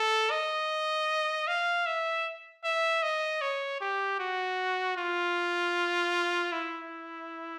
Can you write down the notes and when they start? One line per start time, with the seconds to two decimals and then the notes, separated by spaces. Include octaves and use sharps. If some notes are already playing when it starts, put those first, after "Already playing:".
Already playing: A4
0.31 D#5
1.48 F5
1.86 E5
2.64 E5
3.03 D#5
3.41 C#5
3.81 G4
4.20 F#4
4.97 F4
6.52 E4